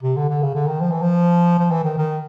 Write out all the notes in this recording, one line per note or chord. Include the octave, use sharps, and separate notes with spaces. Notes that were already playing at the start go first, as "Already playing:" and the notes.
C3
D3
D3
C#3
D3
D#3
F3
E3
F3
F3
E3
D#3
D#3